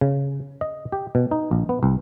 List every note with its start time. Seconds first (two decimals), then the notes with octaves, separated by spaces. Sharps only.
0.01 C#3
0.61 D#5
0.92 G4
1.15 B2
1.31 D#4
1.51 A#1
1.69 B3
1.83 C2